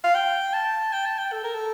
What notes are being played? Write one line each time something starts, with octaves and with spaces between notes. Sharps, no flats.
F5
G5
A5
G5
A5
G5
A4
A#4
A4